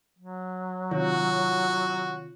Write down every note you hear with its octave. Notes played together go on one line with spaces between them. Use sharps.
F#3
C3 D#3 F4 F#4 C#5